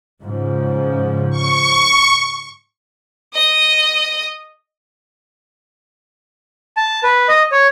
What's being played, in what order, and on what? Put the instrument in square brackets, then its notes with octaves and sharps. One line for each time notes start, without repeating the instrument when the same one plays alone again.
[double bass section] G#2 C#3 F3
[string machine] C#6
[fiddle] D#5 D#6
[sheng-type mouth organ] A5
B4
D#5
C#5